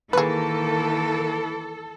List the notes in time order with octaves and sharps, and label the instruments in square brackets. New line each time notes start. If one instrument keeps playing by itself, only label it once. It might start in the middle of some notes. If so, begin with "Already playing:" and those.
[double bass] D#3 A#3 [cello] E3 [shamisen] G#4 B4 [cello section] A4